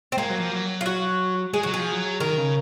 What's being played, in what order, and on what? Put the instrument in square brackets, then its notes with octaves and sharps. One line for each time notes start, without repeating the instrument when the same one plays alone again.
[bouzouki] C4
[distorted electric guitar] G#3 [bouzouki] A#3
[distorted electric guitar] F#3
F3
F#3
[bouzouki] F4
F#4
[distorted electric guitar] G#3 [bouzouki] G#4
[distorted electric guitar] F#3 [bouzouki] F#4
[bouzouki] G#4
[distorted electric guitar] F3
F#3
[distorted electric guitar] D#3 [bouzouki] A#4
[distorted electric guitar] C#3